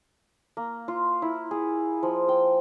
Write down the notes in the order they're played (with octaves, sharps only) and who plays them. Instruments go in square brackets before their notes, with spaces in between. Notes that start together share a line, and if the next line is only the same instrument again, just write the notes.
[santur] A#3
F4
E4
G#4
F3
G5